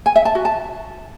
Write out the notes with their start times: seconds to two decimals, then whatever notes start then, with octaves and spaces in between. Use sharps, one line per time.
0.06 G#5
0.16 E5
0.25 A5
0.35 F#4
0.45 A5